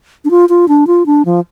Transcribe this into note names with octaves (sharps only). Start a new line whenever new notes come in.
D4
F4
F4
D4
F4
D4
F3